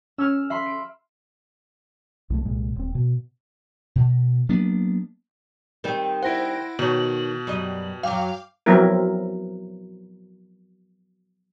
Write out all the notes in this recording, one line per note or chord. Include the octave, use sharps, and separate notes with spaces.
C#4 E6 F6
E5 B5 C6
D7
C2 G3 A3
C2 A#2 G#3
D#1 C4
B2
B2
F#3 A#3 B3 D4
D#3 G3 C4
E4 C5 F#5 A#6 D7
B2 D#3 C#5 F#7
F#2 G3 D#5
F#2 F#3 F5 G5 D6
F3 F#3 B3 C4 E4 A#4